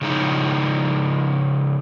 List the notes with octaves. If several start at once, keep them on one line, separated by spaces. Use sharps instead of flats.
C#3 F3 G#3 D#4 E4